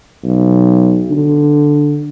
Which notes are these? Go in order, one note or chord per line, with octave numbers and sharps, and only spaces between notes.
B1
D3